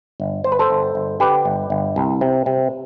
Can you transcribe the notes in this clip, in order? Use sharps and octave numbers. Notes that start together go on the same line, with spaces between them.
G1
G1 C5
B4
A4 C5
G1
G1
D3 G4 B4
G1
G1
C2
C3
C3